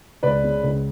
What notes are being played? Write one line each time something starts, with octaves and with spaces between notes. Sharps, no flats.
C#2 B4 D5
C#3
C#2